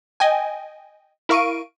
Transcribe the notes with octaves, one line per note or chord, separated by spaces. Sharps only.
D#5 G5 G#5
E4 A#4 F5 C#6 D7 D#7